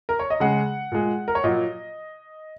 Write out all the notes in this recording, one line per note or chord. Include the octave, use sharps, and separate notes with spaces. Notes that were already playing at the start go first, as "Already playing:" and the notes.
A#4
C#5
D#5
C#3 G#3 F#5
A#2 G#3
A#4
C#5
A#2 F#3 D#5